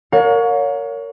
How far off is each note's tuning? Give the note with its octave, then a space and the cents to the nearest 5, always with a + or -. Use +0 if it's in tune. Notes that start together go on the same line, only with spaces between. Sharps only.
A#4 -15 C#5 +20 F5 +45